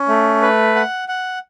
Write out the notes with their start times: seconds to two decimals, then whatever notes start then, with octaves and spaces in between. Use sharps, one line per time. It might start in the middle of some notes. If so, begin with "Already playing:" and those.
Already playing: C#4
0.08 A3
0.42 B4
0.75 F#5
1.08 F#5